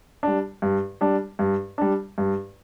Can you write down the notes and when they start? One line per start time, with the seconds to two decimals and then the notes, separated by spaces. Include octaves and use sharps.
0.23 G3 D4
0.62 G2
1.01 G3 D4
1.39 G2
1.78 G3 D4
2.18 G2